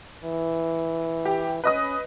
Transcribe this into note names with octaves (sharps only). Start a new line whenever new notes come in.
E3
G4
C#4 B4 D#5 D#6